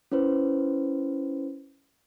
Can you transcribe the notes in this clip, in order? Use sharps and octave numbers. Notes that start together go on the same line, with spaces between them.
C#4 E4 B4 C5